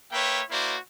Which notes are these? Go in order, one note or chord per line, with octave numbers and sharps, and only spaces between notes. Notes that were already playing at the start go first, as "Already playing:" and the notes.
A#3 B4 C#5 E5 G5
A#3 E4 F#4 C5 D5